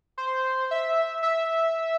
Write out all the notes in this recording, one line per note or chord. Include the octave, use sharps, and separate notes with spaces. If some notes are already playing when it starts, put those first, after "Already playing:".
C5
E5
E5